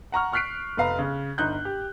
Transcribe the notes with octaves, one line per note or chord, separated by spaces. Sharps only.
F#5 A#5 C#6 F6
C#6 F6 F#6 B6 C7 D7
F1 B4 F5 A#5
C#3
G1 D#4 F#6 G6
G4